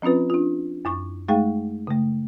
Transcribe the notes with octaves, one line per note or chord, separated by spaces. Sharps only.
F3 C4 C#4 F4 B4
D4 F4
F#2 E4 C#6
G#3 A3 D#4 G#4 F5 G5
C#3 A3